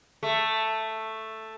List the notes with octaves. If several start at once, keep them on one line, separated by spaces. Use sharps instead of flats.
A3